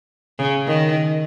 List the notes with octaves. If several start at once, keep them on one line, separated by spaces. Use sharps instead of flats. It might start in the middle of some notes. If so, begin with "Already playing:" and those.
C#3
D#3